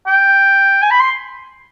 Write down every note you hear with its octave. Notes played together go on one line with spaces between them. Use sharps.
G5
G#5
B5
C6